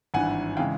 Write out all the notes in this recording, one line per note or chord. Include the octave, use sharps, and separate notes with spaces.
G#1 G2 E3 F#5 G#5
C#3 E3 G#3 F5 G5